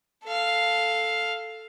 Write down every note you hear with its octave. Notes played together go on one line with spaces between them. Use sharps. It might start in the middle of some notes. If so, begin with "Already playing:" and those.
A4 F5